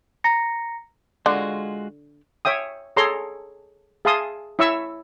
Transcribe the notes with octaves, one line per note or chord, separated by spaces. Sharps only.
A#5 A#6 C#7
D3 G#3 F4 F#4
C#5 E5 G5 D#6
G#4 A4 C#5 A#5 C6
G#4 E5 F5 A5 C6 D#6
E4 C#5 E5 C#6 E6